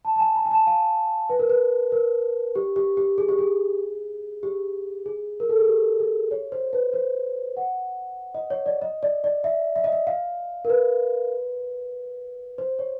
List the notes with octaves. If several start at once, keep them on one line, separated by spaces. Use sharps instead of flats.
A5
A5
G#5
A#5
G#5
A5
F5
B4
A#4
B4
A#4
G4
G4
G4
G#4
G4
G#4
G4
G#4
A#4
A4
G#4
G4
G#4
C#5
C5
B4
C5
F#5
D#5
C#5
D5
D#5
D5
D5
E5
E5
D#5
E5
F5
A#4
B4
C5
C#5